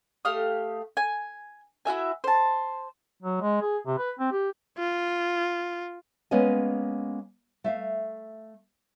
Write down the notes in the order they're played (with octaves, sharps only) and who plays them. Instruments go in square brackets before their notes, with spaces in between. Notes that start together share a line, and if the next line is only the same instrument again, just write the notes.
[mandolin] A3 G4 F5 D#6
G#5
E4 F#4 E5 G#5
C5 A5
[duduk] F#3
G#3
G#4
C3
B4
C4
G4
[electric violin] F4
[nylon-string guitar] G#3 A#3 B3 C#4 D#5 G#5
A3 E5 F5